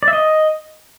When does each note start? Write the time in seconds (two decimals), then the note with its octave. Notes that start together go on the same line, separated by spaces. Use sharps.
0.03 D5
0.08 E5
0.13 D#5